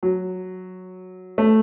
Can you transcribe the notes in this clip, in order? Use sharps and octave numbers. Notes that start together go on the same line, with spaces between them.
F#3
A3